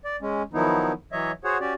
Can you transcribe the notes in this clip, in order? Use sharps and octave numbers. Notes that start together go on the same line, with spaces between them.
D5
G#3 C#4
D#3 F3 F#3 B3 D#4 E4
E3 F#3 C#5 D#5 E5
F#4 G#4 C5 C#5 F#5
C#4 F#4 G4 D5